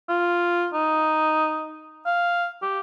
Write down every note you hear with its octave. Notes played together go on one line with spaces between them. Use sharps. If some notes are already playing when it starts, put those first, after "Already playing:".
F4
D#4
F5
G4